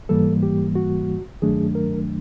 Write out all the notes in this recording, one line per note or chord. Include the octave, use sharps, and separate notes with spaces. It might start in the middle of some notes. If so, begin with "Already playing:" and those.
G#2 E3 G3 A#3 A4
G4
F#4
G2 D#3 F#3 A3 D4 G#4
A#4